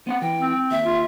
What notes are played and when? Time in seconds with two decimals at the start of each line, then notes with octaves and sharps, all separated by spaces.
0.07 B3 C4 F#5
0.22 E3 G5
0.41 C4
0.71 D#2 E5
0.85 F4